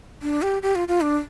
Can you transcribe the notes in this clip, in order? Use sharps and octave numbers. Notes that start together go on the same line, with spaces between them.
D4
G4
G4
F4
F4
D4